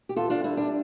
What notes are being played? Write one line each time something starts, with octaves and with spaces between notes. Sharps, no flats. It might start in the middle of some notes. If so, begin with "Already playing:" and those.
G4
E2 F4 A4
D4 F4
G3 E4
D4